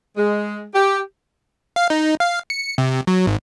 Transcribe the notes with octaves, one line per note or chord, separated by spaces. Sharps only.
G#3
G4
F5
D#4
F5
C#7
C3
F#3
G#1